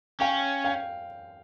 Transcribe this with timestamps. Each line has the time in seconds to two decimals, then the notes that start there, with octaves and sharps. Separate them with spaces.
0.20 C#4 F5 G5
0.64 F5 G5